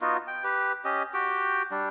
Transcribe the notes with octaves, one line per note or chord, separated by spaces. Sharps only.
B3 D#4 F4 F#4
G5
G4 B4
C#4 G4 D#5
F#4 G4 G5
G3 D4